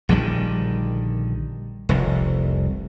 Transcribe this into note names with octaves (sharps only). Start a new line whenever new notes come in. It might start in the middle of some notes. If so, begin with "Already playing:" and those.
A#1 D3 D#3 G3
F1 C2